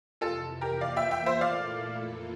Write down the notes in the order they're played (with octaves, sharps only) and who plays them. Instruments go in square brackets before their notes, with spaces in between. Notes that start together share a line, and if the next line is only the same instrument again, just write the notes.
[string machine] F2 C3 E3 [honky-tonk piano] F4 A4
[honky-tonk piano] G4 A#4
[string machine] E2 E3 A#3 F4 [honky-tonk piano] D5 F5
[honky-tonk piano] E5 G5
E5 G5
C5 E5
[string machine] A#2 A3 E4 A4 [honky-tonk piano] D5 F5
[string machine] F2 E3 A#3 F4 A4